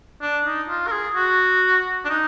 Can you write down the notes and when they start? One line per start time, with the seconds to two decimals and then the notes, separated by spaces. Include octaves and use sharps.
0.22 D4
0.45 D#4
0.69 F4
0.87 A#4
0.91 G#4
1.15 F#4
2.05 D4
2.09 D#4